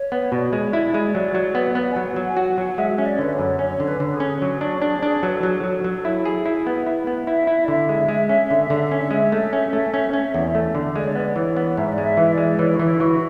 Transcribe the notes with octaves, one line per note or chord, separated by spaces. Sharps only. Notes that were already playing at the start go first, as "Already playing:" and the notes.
Already playing: C#5
B3
B2 D5
G#3
E4
G#3
F#3
F#3
B3
B3
G#5
F#3 F#5
F#3
G#5
F#4 F#5
F#3
G#3 E5
C#4 E5
D5
D3 B4
C#5
F#2
C#4 C#5
D3
B4
D3
G#4
C#4
F#3 F#4
D4
D4 G#4
D4
F#3 B4
A4
F#3 G#4
A4
F#3
F#3
E4
G#4
E4
B3
E4 B4
B3
E4 E5
E4
D5
D3 E5
G#3
G#3
C#4
D3
D3
C#4
G#3
A3
C#4
A3
C#4
C#4
E2
A3
D3
G#3 D5
C#5
B3 D5
E3 C#5
B3
G#2 E5
D5
G#3
E5
E3
D5
G#3
E3 C#5
F#4
E3 E4
E3 F#4